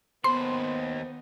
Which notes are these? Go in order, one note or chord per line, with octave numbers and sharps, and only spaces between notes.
D#2 B3 C5 B5 C6